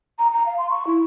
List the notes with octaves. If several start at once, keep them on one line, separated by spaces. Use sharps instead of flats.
A#5
A#5
F5
C6
C#6
E4